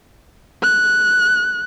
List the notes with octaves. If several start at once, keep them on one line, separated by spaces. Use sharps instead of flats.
F#6